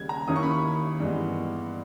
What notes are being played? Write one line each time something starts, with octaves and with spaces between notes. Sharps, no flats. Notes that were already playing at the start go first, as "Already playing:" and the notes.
Already playing: D#2 C#3 G3 G#6
A#5
D#2 D#3 A#3 C#4 E4 D#6
C#6
B5
C#6
G2 E3 G#3 B3